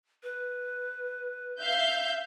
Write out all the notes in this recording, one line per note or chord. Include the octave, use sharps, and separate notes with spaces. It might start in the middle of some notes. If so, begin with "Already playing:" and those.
B4
E5 F5 G6